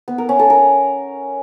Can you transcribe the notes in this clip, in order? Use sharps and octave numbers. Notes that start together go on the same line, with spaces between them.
B3
A#4
C#4
A4
A#4